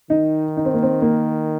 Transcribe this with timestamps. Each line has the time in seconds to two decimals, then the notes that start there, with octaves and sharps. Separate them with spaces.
0.10 D#3 D#4
0.57 D#4
0.65 C4
0.74 A#3
0.82 C4
1.02 A#3